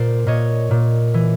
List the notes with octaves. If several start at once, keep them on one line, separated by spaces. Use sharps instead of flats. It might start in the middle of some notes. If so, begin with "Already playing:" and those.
Already playing: A#2 C5 D5
A#2 C#5 D#5
A#2
E3